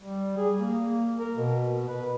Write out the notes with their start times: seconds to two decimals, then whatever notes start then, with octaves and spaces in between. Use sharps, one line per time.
0.01 G3
0.38 G#4
0.59 A#3
1.19 A#4
1.37 B2
1.89 B4